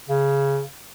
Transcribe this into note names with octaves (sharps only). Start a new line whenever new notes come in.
C#3